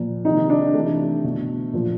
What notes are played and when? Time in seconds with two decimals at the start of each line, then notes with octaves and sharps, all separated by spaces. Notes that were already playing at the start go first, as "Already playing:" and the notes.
Already playing: A#2 F3
0.25 C3 D#3 D#4
0.50 D4
0.74 C3 E3 A3
1.24 B2
1.73 A#2 F3